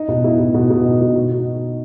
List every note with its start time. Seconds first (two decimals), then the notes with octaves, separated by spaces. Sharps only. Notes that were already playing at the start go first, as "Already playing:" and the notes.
Already playing: D#4
0.08 B2
0.24 B2 E4
0.39 B2
0.54 B2 F#4
0.70 B2
0.85 D#4
1.01 B2
1.16 B2 F#4
1.31 D#4 F#4